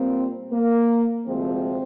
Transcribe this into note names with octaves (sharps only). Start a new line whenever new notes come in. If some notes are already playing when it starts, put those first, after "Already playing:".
Already playing: A#2 G3 A#3 C4
A#3
D2 C3 F3 G#3 C4